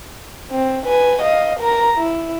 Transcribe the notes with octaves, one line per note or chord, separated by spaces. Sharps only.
C4
B4 G#5
D#5 F5
A#4 A#5
E4